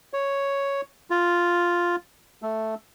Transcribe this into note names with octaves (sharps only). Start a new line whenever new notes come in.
C#5
F4
A3